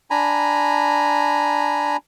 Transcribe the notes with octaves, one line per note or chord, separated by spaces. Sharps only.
D4 G#5 A#5 B5